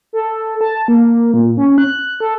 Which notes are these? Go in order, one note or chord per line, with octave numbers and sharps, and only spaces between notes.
A4
A5
A#3
A#2
C#4
F#6
A4